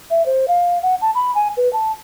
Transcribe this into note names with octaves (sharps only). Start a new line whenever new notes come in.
E5
C5
F5
F#5
A5
B5
G#5
B4
A5